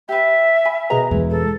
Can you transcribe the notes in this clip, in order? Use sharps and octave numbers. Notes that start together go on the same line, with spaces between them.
G4 B4 E5
G#5 B5
B2 G#4 A#4 B4 D#5 A#5
E2 G#3 E4
A4